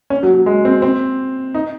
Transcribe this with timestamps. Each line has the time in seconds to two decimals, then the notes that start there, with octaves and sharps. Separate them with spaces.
0.10 C#4
0.23 F#3
0.34 F#3
0.46 G#3
0.65 C4
0.82 C4
1.54 D#4